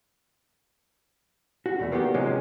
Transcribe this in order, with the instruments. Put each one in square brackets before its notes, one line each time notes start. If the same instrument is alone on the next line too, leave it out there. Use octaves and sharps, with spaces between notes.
[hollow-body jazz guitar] F#4
B1 E2 A3
D#3 A#3 B3 E4 F#4 G4
C3 F3 F#3 G#3 A#3 C#4